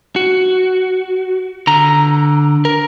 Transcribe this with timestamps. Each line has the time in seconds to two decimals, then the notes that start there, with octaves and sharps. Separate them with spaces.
0.16 F#4
1.67 D3 A#5
2.65 A#4